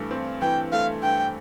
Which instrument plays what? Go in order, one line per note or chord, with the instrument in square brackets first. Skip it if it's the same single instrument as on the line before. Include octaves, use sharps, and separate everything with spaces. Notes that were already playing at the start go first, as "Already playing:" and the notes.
Already playing: [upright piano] G2 E3 A3
C4
[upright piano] E3 [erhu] G5
[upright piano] A3 [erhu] F5
[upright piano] G2 [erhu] G5